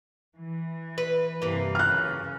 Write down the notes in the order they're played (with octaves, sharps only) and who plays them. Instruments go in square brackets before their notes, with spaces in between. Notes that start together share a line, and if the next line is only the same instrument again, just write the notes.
[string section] E3
[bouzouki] B4
[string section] G2 C3 E3 [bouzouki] A#3 B4
[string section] F#2 C#3 [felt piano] F6 F#6